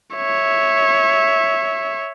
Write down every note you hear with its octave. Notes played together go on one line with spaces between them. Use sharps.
C#5 E5